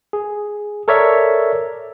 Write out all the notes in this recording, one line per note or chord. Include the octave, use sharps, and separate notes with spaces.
G#4
A4 A#4 C#5 D5 E5